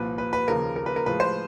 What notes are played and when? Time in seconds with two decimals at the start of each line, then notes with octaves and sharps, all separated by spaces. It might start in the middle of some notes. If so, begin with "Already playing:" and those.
Already playing: C2 A#2 F3 B4
0.18 B4
0.33 B4
0.48 D#2 C#3 F3 A#4
0.76 A#4
0.86 B4
0.96 A#4
1.06 A2 F3 G#3 B4
1.20 C5